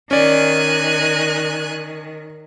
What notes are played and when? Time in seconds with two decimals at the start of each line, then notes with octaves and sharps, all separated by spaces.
0.11 D#3 C#4 D5 G#5 F#6